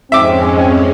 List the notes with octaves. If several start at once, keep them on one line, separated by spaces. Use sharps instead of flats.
F2 G#2 G#3 C4 C#4 E5 D6